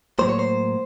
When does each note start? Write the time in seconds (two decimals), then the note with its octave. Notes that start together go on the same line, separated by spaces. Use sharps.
0.19 A2 F#3 A#3 C5
0.29 C#5
0.39 C5